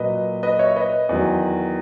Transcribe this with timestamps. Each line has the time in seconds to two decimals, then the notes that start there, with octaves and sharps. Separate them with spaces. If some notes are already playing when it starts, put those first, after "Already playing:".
Already playing: A#2 F#3 B4 D#5
0.43 B4 D#5
0.59 C#5 E5
0.76 B4 D#5
1.09 E2 D#3 F#3